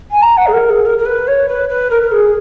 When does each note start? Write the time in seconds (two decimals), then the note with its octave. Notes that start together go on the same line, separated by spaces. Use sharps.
0.10 G#5
0.21 A#5
0.37 F#5
0.47 G#4
0.53 A#4
0.69 G#4
0.85 A#4
0.98 A#4
1.05 B4
1.27 C#5
1.48 B4
1.68 B4
1.90 A#4
2.02 A#4
2.11 G#4